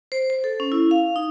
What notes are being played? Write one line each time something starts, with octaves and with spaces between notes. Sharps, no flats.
C5
C5
A4
C#4
E4
F5
D#4